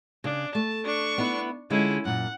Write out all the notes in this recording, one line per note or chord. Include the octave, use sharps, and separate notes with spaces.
C#3 D4
A3 A5
D4 C#6
B3 E4
D3 G#3 C#4 E4 F4
F#2 A#2 F#5